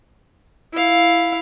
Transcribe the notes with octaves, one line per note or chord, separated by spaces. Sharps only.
E4 F5